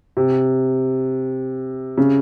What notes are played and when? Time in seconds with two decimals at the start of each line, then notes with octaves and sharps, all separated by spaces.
0.17 C3
1.98 C#3